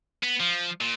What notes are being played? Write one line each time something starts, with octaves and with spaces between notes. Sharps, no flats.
B3
F3
A#2